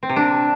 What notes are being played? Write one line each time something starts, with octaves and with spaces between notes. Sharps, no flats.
C4
C3
D4